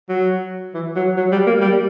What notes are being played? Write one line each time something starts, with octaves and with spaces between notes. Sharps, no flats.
F#3
E3
F#3
F#3
G3
A#3
G3